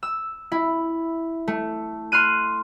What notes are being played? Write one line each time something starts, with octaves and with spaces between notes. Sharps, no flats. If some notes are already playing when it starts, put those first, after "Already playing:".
E6
E4
A3
C6 F6 F#6 D#7